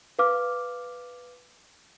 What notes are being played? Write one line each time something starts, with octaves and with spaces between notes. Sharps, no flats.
B4 F5 D6 F6